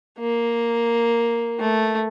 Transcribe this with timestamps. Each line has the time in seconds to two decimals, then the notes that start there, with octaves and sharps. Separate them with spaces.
0.19 A#3
1.60 A3